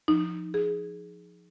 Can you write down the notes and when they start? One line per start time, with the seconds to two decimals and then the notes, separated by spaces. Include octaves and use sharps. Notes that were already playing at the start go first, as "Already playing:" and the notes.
0.08 F3 D#4
0.54 G#4